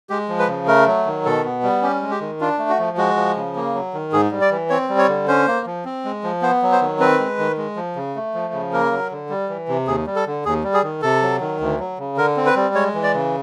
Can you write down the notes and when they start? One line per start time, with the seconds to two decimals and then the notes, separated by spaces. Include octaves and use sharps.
0.10 G#3 G4
0.29 F3
0.39 B4
0.48 C#3
0.68 A3 A#4
0.87 F#3
1.06 D#3
1.25 B2 A4
1.45 B3
1.63 G3
1.82 C#4 G4
2.02 G#3
2.11 G4
2.21 D#3
2.41 D4 F4
2.59 A3
2.70 F#4
2.79 F3
2.98 G#3 F#4
3.16 F3
3.36 C#3
3.56 A#3
3.74 F#3
3.94 D#3
4.13 G#2 G#4
4.31 G3
4.41 D5
4.51 E3
4.70 C4 C#5
4.89 G3
4.99 C#5
5.09 D3
5.28 C#4 C5
5.47 A#3
5.66 F3
5.85 C4
6.05 G#3
6.24 F3
6.42 B3 C5
6.62 F#3
6.72 C5
6.81 D#3
7.00 C4 B4
7.20 G#3
7.39 D#3
7.58 G#3
7.76 F3
7.96 C#3
8.16 A3
8.34 F3
8.54 C#3
8.73 A#3 A#4
8.92 F#3
9.12 D3
9.29 G3
9.49 E3
9.69 C3
9.87 D#2 G#4
10.07 G3
10.16 A4
10.27 D3
10.45 D#2 G#4
10.64 G3
10.74 G#4
10.83 D#3
11.02 C3 A4
11.22 F#3
11.41 D#3
11.61 D2
11.80 F#3
11.99 C#3
12.17 D3 A#4
12.37 C4
12.46 B4
12.56 G3
12.74 G#3 C#5
12.94 E3
13.03 D5
13.14 C#3